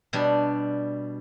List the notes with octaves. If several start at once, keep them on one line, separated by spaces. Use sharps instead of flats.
B2 G3 D4